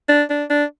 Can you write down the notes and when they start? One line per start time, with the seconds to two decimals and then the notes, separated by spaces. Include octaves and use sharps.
0.09 D4
0.30 D4
0.50 D4